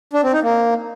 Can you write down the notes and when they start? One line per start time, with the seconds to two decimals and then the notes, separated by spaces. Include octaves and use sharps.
0.13 D4
0.23 C4
0.33 D#4
0.43 A#3